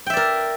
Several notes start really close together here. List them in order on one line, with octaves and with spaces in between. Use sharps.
G5 E5 D5 A#4